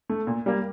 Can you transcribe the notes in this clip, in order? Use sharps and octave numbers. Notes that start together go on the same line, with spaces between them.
A3
A#2
G3 A#3